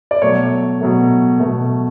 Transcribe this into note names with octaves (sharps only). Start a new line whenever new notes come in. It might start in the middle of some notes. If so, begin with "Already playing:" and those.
D5
B2 F#3 A3 C#5
B2 F#3 A3
B2 F#3 A3